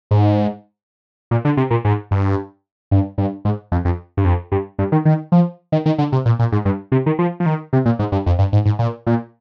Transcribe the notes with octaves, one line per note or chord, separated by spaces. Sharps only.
G#2
A#2
D3
C3
A#2
G#2
G2
G2
G2
G#2
F2
F2
G2
F2
G2
G2
D#3
D#3
F3
D#3
D#3
D3
C3
A#2
A#2
G#2
G2
C3
D#3
F3
F3
D#3
C3
A#2
G#2
G2
F2
G2
G#2
G#2
A#2
A#2